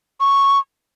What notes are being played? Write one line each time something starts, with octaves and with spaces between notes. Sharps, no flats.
C#6